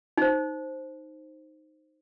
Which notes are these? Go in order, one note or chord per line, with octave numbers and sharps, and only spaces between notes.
D#4 C5